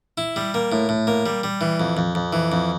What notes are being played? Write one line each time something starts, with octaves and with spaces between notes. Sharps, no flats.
E4
G3
A#3
A2
A2
A#3
G3
G3
E3
F2
F2
F2
E3
F2